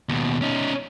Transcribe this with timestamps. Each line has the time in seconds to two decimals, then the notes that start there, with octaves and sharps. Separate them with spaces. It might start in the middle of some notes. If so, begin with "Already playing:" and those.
0.09 D#2 B2
0.42 C#4 D#4